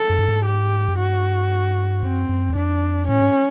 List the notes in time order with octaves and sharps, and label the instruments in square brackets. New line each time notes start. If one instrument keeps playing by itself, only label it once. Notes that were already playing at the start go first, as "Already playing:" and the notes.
Already playing: [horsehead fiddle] A4
[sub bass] F#2
G2
G#2
[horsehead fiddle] G4
[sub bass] F#2
[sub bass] G2 [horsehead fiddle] F#4
[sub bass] F#2 [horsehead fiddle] C4
[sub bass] F#2
E2
[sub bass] F2 [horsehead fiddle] D4
[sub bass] A2 [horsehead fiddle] C#4
[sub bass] G#2